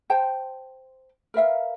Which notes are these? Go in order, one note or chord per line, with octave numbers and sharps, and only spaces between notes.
C5 G5 A5
A#4 B4 E5 F5